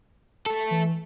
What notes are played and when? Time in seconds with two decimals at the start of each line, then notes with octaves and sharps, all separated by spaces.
0.46 A3 A4
0.71 E3